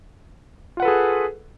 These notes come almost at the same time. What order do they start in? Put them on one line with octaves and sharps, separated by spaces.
F4 F#5 B4 A4 G#4